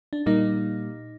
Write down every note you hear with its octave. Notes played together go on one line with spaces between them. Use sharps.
D4
A#2 G3 A#3 D#4